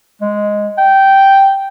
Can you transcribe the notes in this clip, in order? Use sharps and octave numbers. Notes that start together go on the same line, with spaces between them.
G#3
G5